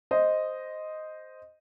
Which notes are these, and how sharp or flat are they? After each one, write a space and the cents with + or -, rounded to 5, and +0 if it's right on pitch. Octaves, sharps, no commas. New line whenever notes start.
C5 -5 D#5 +0